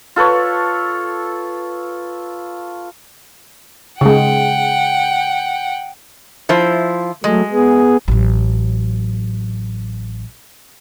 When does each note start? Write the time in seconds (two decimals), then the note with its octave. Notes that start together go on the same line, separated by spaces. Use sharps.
0.16 F4 A4 B4 C#5
4.01 C#3 G#3 F#5 G5
6.49 F3 E4 C5
7.24 F#3 G#3 A3
7.52 B3 G#4
8.08 A1 F#3